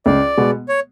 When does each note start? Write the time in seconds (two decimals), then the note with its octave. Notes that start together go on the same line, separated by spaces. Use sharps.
0.06 C#2 D5
0.37 B2 G#3 B3
0.69 C#5